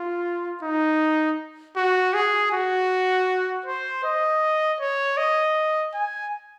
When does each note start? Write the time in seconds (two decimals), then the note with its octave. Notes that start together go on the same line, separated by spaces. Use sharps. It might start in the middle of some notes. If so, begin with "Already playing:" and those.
Already playing: F4
0.63 D#4
1.77 F#4
2.14 G#4
2.52 F#4
3.66 C5
4.04 D#5
4.81 C#5
5.18 D#5
5.94 G#5